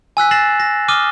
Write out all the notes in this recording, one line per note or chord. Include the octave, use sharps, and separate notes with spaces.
G#5 E6 F#6 B6
A6 A#6 C7 E7 F#7
A#6
D6 D#6 F6 D#7 G7